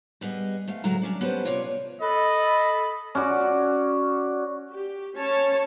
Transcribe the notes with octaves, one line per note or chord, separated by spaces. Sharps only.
G3 B3 G#4 D#5
G#2 A3 F5
D2 A2 F#3 G#3 A4 A#5
C#4 D4 D5
B3 C#4 G4 A4 B4 C5
C3 F4 C#5 D5
A4 D#5 B5
C#4 F#4 D5
G4
C#4 C#5 A5